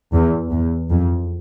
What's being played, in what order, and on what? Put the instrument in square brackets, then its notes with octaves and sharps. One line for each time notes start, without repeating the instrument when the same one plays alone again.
[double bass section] E2
E2
F2